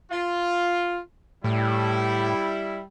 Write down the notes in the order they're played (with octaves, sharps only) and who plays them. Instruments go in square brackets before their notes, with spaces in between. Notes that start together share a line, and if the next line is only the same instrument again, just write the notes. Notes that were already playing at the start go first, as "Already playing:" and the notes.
[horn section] F4
[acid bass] A2 [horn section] G3 E4